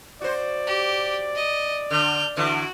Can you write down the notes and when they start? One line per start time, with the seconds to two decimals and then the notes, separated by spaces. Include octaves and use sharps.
0.22 F#4 C5 D5
0.67 G4
1.35 D#5
1.91 D3 F6 G6
2.37 D3 E3 F#4